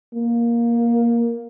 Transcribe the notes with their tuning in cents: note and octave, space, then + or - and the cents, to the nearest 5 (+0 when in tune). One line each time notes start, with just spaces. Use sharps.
A#3 +10